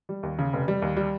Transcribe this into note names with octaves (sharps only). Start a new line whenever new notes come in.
G3
D#2
C#3
F1
G3
D#2
G3